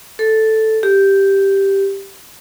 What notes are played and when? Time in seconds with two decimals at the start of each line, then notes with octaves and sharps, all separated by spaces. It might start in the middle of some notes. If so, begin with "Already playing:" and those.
0.19 A4
0.83 G4